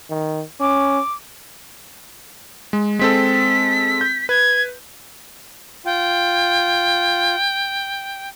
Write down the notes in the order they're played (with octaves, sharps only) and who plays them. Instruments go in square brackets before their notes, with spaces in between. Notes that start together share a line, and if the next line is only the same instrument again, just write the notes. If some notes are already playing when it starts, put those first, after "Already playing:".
[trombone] D#3
[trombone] C#4 [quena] D6
[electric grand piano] G#3
[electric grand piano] G#3 C4 A4 [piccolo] B6
[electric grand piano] G6
[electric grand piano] B4 [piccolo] G#6
[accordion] F4 [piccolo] G5